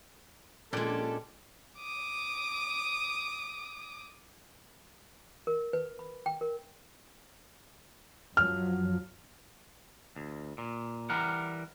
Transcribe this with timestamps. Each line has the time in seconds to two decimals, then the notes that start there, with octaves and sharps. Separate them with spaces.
0.73 A#1 A#2 G#3 C#4 D4 G4 A4
1.78 D6 D#6
5.47 A#4
5.73 B4
5.99 B5
6.26 G5
6.41 A#4
8.37 F#2 F3 F#3 F6
10.16 D2
10.58 A#2
11.10 E3 G3 A#4 F#5